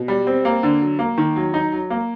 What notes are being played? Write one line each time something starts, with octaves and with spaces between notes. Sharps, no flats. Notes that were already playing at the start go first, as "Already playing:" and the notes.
Already playing: B2
G3
C4
A#3
D3
F#3
A#3
D#3
F#3
D#4
F#3
A#3